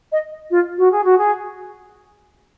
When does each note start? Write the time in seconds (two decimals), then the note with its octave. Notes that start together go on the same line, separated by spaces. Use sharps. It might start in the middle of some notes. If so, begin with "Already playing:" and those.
0.12 D#5
0.50 F4
0.77 F#4
0.91 G#4
1.04 F#4
1.18 G#4